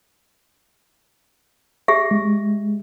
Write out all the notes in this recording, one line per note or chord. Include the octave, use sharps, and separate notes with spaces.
G4 G#4 E5
G#3